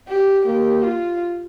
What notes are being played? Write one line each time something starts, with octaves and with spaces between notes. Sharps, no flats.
G4
A#3 G4
F4